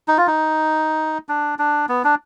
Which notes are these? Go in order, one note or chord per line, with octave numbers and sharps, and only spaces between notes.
D#4
F4
D#4
D4
D4
B3
D4